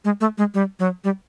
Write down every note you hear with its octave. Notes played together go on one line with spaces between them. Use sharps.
G#3
A3
G#3
G3
F#3
G3